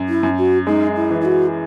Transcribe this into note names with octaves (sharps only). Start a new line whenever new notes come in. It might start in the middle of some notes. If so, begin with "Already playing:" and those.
Already playing: F#2
E4
F#2
F#4
G#3 D#4
E4
E3
E4
F#4